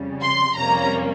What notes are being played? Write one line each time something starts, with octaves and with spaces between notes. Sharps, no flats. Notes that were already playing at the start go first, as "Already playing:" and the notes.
Already playing: F2 C#3 G3
C6
F2 C3 G3 A#3 C#4 A#5